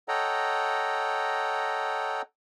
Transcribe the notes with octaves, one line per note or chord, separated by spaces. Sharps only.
A4 C#5 D#5 F#5 G5 A#5